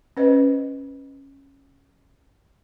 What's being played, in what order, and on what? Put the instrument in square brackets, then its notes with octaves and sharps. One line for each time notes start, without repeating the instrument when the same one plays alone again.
[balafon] C#4 B4 C5 D#5